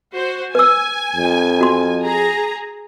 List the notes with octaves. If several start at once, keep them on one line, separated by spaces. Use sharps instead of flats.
F#4 C5
B4 G#5 E6
F2
F#4 C6
G#4 A#5